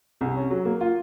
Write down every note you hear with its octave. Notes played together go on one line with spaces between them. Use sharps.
C2
C#4
F#3
A#3
F4